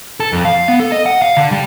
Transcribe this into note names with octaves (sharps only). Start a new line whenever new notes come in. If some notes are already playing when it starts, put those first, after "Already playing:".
A4
F2
F5
B3
A4
D#5
F#5
F5
D3
G3